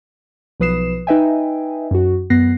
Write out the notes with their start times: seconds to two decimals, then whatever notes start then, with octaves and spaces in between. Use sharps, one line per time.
0.60 B1 F3 B4 D#6 C7 E7
1.07 D#4 B4 D#5 E5 G5 G#5
1.91 F#2 F#4
2.30 F#2 B3 F#6 A#6 C7